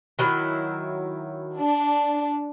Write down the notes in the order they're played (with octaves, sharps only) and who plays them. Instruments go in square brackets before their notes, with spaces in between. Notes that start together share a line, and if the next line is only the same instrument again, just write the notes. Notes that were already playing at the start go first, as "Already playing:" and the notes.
[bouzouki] D#3 F#3 E4
[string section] D4